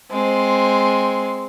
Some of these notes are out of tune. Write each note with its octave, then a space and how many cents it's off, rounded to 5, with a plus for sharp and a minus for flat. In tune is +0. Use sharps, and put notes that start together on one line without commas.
G#3 +0 C4 +0